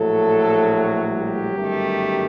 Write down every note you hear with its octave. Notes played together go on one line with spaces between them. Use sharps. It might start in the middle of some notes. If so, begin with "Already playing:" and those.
Already playing: A#1 A2 F#3 A3 A4
G3 G4
G1 F#2 D#3 A3